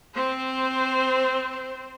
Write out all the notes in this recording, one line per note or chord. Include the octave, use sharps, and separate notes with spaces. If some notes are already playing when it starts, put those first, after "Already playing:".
C4 C5